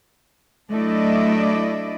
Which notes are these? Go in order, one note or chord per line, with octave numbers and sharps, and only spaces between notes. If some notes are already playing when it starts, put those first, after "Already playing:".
F#3 A3 D4 E4 D5 D#5